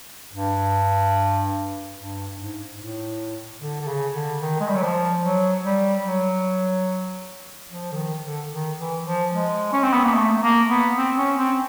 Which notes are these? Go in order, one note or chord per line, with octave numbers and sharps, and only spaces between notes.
G2
G2
G#2
A2
D3
D3
C#3
D3
D#3
G#3
G3
F#3
F3
F#3
G3
F#3
F3
D3
D#3
D3
D#3
E3
F3
G#3
C#4
C4
B3
A#3
A3
A3
A#3
B3
C4
C#4
C4